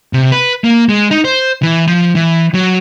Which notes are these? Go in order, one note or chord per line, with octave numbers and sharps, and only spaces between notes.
C3
B4
A#3
G#3
D#4
C5
E3
F3
E3
F#3